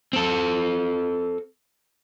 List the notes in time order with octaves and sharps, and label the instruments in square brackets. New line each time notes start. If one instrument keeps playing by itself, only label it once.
[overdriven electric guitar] C4 A4